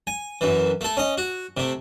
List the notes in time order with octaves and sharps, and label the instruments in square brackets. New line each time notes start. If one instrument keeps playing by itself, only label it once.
[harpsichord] G#5
F#2 E3
A3 A4
C#4 D#5
F#4
C3 A3